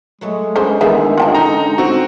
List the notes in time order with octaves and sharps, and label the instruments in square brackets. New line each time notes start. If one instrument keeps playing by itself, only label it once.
[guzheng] F#3 A3 C#5 [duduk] G#3
[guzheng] G2 [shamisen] C#4 G#4 C5
[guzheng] D#3 E3 E4 [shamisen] B3 G#4 E5
[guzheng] D3 C#4 [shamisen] F4 G5 A5
[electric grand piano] D#4 A#5
C4 F#4